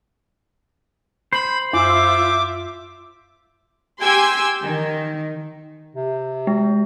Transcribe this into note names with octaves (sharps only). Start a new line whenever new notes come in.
C5 B5
F#2 F4 E5 D6
G4 G5 G#5 C6 E6 G#6
D#3
C3
G#3